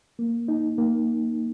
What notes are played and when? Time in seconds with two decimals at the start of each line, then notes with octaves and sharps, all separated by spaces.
0.19 A#3
0.48 D#4
0.78 A#3